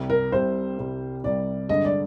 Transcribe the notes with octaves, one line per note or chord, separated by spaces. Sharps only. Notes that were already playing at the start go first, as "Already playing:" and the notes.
Already playing: C2 C3 G3
A#4
C2 C3 G3 C5
C2 C3 G3
C2 C3 G3 D5
G2 D3 G#3 D#5
D5